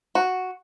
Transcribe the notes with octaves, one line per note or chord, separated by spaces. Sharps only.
F#4